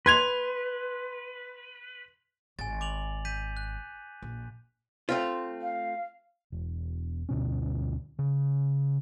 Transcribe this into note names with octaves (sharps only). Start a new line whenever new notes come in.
B4 C6 G#6 F7
G#1 G#5 A6
D6 F7 F#7
G6 B6 D#7
F#6
A#1
A3 C4 F4
F5
E1
D2 B2 C#4
C#3